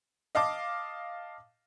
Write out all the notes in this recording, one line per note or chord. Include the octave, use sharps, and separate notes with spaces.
D#5 F5 A5 D6